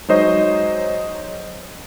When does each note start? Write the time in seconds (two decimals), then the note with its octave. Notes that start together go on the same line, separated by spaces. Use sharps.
0.09 F#3 G#3 D#4 C5 C#5 D#5